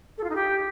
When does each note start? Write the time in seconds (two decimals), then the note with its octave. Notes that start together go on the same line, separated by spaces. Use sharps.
0.18 A4
0.23 F4
0.29 D#4
0.35 G4